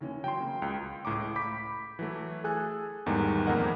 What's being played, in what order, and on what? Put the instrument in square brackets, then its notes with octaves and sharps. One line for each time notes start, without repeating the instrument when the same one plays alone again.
[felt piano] D#2 E3 C#4
[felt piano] F#3 [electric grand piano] G5 C6
[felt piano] C#3 A#3
[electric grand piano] C#2 [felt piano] G5 C6
[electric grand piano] C#2 A2 A#5 D6
B5 D6 G6 B6
E3 F#3 A3
G#4 A4 G#5 F#6
E2 G#2 D#3 G3 A3
F2 A#2 A#4 D#5 F#5